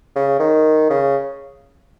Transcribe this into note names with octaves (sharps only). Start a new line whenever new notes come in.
C#3
D#3
C#3